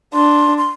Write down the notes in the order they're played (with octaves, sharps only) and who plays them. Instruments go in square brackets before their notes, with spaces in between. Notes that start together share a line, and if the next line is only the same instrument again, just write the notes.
[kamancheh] D4 [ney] C6
[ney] C6